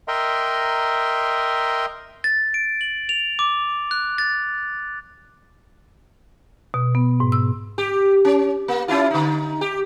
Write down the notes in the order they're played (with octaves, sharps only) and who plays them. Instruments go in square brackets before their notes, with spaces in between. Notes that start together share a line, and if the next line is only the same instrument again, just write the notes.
[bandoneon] A#4 D#5 E5 G5 A#5 C6
[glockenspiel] A6
D7
F#7
F7
D6
F#6
A6
[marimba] B2
B3
G#2
E6
[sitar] G4
C#4
A#3
C#4 E4 F4
D3 D#4
G4